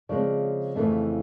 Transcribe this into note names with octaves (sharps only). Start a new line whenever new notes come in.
C#3 F3 G#3 C4 D5
F2 C#3 E3 A3 C4